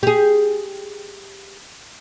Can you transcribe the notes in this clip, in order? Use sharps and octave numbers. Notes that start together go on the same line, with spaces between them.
G4 G#4